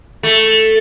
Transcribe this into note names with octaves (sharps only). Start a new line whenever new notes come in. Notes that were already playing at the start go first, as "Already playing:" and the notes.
A3